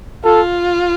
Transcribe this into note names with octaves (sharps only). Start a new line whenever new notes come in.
F4 A4